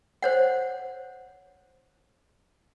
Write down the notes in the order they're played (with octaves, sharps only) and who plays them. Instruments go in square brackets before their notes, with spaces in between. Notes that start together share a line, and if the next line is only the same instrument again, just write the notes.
[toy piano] C5 C#5 F#5